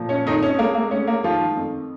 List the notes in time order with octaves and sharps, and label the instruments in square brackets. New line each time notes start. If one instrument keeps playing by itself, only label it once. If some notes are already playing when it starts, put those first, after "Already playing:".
Already playing: [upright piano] A#2 F3
C#4
F2 D#3 D#4
C#4
G#3 A#3
A#3
G#3 C#4
A#3
D#3 F3 F4
F2